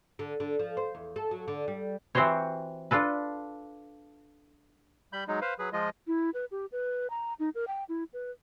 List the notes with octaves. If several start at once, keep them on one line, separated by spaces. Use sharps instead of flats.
D3
D3
F3
C5
E2
A4
F#3
D3
G3
E3 C4 F#4 G4 C5 C#5
D4 F4 A4 B4
G3 B5 G6
F#3 G#3 D#4
B4 C5 F5
F#3 G#4 B4
F3 G#3 F4 D#5
E4
B4
G4
B4
A#5
D#4
A#4
G5
E4
B4